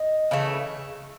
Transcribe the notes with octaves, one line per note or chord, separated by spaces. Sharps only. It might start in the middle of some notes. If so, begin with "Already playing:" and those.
Already playing: D#5
C#3 E3 A3